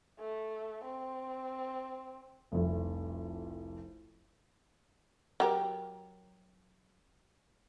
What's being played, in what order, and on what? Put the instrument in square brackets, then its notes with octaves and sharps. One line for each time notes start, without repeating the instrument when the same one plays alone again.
[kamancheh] A3
C4
[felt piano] F1 C2 F2
[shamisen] F#3 G4 A#4